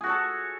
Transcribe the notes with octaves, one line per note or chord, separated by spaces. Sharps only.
F#4 G#4 A4 C#5